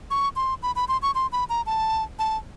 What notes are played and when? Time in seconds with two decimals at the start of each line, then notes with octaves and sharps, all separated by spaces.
0.11 C#6
0.36 C6
0.63 B5
0.76 B5
0.88 C6
1.02 C#6
1.15 C6
1.32 B5
1.49 A#5
1.66 A5
2.19 A5